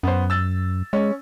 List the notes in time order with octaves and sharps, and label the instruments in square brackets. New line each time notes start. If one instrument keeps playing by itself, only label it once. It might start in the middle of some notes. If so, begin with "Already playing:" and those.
[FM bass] F#2 [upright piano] B3 C5
[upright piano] E6 A6
[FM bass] G#3 [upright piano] C#4